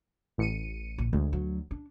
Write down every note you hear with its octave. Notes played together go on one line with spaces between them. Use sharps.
A1 C#7 D#7
A#1
D2 G#3
F#3
D4